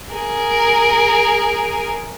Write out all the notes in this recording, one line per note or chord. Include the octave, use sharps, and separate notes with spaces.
G#4 A#4